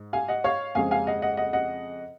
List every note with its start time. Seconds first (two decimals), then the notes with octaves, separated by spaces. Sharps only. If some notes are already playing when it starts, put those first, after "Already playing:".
Already playing: G#2
0.13 F5 G#5
0.28 D#5 F#5
0.44 C#5 F5
0.75 F2 C#3 G#3 C4 F5 G#5
0.91 F5 G#5
1.07 D#5 F#5
1.22 D#5 F#5
1.37 D#5 F#5
1.53 D#5 F#5